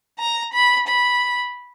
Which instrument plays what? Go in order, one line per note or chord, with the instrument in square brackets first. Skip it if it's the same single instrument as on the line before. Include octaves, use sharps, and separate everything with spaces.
[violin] A#5
B5
B5